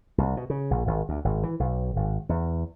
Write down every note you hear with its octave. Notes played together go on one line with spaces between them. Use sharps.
C2
B2
C#3
A#1
G#1
D2
G#1
E3
B1
G#1
E2